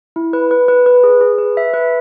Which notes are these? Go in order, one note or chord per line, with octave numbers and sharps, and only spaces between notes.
E4
B4
B4
B4
B4
G#4
G#4
B4
E5
B4